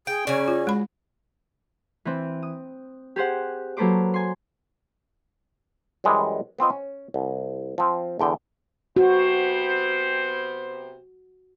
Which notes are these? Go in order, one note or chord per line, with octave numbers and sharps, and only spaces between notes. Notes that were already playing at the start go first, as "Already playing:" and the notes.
G#4 G5 D7
C#3 F#3 C#4 D5
F4
G#3 B5
E3 C4
D#6
G4 G#4 C5 F#5
F#3 A#3 A4 B4 C5 D6
G#5 C6
F#2 E3 G3 G#3
B3 C4 F4 D#5
C#4
C2
F3 C4
E2 D3 G5
C3 B3 F#4 C5